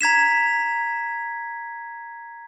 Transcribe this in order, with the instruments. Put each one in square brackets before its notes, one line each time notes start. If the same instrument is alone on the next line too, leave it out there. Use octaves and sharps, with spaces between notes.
[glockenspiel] A#5 G#6 B6 E7